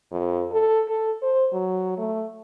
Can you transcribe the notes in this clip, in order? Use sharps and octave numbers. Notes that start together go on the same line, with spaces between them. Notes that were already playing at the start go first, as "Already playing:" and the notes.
F2
A4
A4
C5
F#3
A3